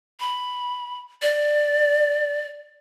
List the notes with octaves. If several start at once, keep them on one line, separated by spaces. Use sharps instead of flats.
B5
D5